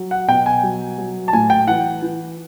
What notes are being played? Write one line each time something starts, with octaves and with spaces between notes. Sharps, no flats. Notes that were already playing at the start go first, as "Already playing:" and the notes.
Already playing: F#3
F#5
B2 G5
G#5
F#3
F#3
A5
A2 G#5
G5
E3 F#5
E3